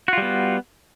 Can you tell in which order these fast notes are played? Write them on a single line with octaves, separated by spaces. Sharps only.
F#4 F4 G3 B3